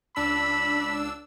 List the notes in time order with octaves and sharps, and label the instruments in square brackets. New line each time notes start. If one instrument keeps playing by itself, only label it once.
[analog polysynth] C#2 D4 E6 [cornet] B5